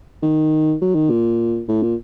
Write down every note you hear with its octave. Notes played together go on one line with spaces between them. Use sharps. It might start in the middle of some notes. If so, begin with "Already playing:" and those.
D#3
F#3
D#3
A#2
A2
A#2